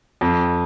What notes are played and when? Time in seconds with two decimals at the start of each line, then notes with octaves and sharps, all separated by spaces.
0.21 F2